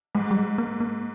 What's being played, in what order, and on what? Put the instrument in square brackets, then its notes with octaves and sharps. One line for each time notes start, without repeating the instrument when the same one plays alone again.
[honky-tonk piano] G#2 [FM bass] G#3
[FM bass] G3
G#3
A#3
A#3